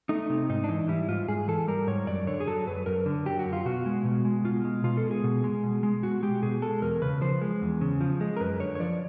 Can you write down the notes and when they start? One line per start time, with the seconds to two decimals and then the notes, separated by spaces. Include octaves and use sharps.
0.09 A3 D#4
0.30 C3
0.49 G#2 D#4
0.64 D4
0.69 E3 D#4
0.89 G3 E4
1.08 G#2 F4
1.28 G#2 G#4
1.48 E3 A4
1.68 G3 A#4
1.87 G#2 C#5
2.07 F#2 D5
2.27 D3 C#5
2.40 G#4
2.47 F#3 A4
2.67 F#2 B4
2.86 F#2 A#4
3.06 D3
3.26 F#3 G4
3.39 F#4
3.46 F#2
3.53 F4
3.65 B2 F#4
3.86 G#3
4.05 B2
4.25 G#3
4.45 B2 F4
4.65 G#3
4.84 B2 F4
4.97 A4
5.04 G#3
5.11 G#4
5.24 B2
5.44 G#3
5.64 B2
5.83 G#3
6.03 B2 F#4
6.23 G#3 G4
6.43 B2 G#4
6.62 G#3 A4
6.82 E2 A#4
7.02 C#3 B4
7.21 F3 C5
7.42 G#3
7.62 E2
7.81 C#3
8.01 F3
8.21 G#3
8.37 A#4
8.40 F#2 B4
8.60 D3 C#5
8.75 C#5
8.80 F3 D5